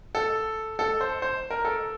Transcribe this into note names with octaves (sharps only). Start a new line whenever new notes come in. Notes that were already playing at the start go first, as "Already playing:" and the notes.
A4
A4
C5
C5
A#4
A4